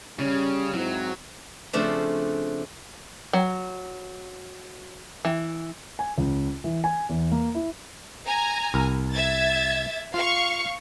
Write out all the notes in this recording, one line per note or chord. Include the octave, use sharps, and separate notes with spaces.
C#3 G3 C#4
G#2 F#3 C4 E4
C#3 F3 A3 C4 D4
F#3
E3
G#5
C#2
E3
G#5
E2
A#3
E4
G#5 A#5
C2 A#4
E5 G#6 A6
F4 F5 C#6